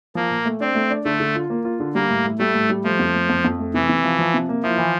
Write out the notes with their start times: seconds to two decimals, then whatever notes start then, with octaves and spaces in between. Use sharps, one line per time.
0.15 F3 A#3
0.31 A#2
0.45 A3
0.60 C4 D4
0.75 A3
0.90 D4
1.05 D3 A3
1.20 D3
1.35 F4
1.50 A#3
1.65 F4
1.80 D3
1.94 G3 A#3
2.10 A2
2.25 A2
2.39 G3 A3
2.54 A2
2.70 G3
2.84 F3 A3
2.99 F2
3.14 A3
3.29 F2
3.44 F2
3.59 A3
3.74 C3 E3
3.89 C3
4.04 F3
4.19 F3
4.34 C3
4.49 A#3
4.63 F3 E4
4.78 E3